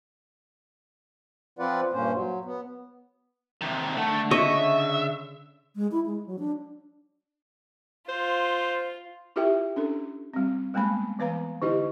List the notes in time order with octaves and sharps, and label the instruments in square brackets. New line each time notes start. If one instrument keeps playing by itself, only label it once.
[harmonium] F3 C4 F4 B4 D5 F#5
G2 A#2 A#3 C#4 C5
F#3
B3
[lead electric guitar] C3 D#3
[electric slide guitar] D3 F#5 [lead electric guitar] A3
[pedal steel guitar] C#3 C#5 C#6 [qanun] D#5 [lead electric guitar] E5
[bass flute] G#3
E4
G#3
F#3
D4
[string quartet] F4 [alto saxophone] C5
[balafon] E4 F4 G4 A#4 E5 G5
C#4 D4 A4
G3 C4
G3 G#3 A#3 B3 B5
E3 B3 B4 F5 A#5
D3 D#4 E4 G4 D#5